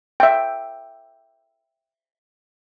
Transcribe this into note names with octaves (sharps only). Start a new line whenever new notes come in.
E5 G5